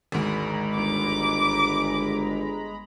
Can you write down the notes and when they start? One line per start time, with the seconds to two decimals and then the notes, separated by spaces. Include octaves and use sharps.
0.12 G#1 D2 G#3 A#5 B5
0.76 G1 D6